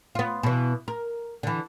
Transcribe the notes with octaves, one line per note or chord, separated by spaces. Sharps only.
B3 F4
B2 E3
A#4
D3 E3